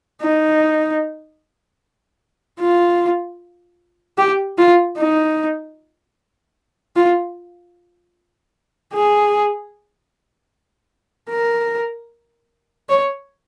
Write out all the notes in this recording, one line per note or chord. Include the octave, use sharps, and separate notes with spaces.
D#4
F4
G4
F4
D#4
F4
G#4
A#4
C#5